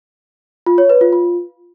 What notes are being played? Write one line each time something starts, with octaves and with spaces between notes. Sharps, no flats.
F4
C#5
B4
F4
F4